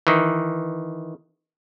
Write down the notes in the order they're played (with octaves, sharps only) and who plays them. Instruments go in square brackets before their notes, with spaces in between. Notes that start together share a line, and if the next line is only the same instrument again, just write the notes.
[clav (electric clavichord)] D#3 E3